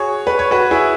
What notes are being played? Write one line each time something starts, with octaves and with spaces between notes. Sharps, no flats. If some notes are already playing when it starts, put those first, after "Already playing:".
Already playing: F#4 G#4 C#5
B4
C#5
F#4 B4
E4 G#4